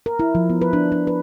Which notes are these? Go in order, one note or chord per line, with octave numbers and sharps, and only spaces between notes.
A#4
E4
F3
B3
B4
D4
D4
B4